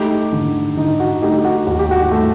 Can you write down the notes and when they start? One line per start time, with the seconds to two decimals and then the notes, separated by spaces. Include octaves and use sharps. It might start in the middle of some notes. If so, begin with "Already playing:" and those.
Already playing: A3 D#4 G4
0.32 D3
0.77 D3 D#4
1.00 F#4
1.22 A3 D#4 G4
1.45 F#4
1.67 D#2 F#4
1.79 G4
1.91 F#4
2.11 A3